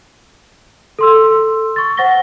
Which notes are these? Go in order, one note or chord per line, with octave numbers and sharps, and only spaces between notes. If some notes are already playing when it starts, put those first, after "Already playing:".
A4 C6 E6
C#6 A6
C5 F#5 A6 A#6 G7